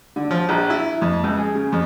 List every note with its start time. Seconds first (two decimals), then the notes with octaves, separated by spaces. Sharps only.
0.16 D3
0.31 F3
0.49 A#1
0.70 E4
1.02 F2
1.24 C#2
1.38 G#4
1.55 C#3
1.72 F2